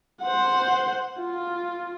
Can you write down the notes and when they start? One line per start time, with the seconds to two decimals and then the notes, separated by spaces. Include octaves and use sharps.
0.23 C5 F#5
1.20 F4